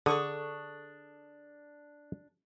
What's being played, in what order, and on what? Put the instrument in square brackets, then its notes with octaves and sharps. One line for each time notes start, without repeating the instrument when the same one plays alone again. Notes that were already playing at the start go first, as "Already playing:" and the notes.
[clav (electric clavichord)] D3 [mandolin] D4 C#6 D#6 [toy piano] G#4 A4